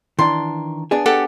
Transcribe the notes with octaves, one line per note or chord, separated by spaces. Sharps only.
D#3 E3 D4 C6
B3 D4 G#4
G4 A4 F#5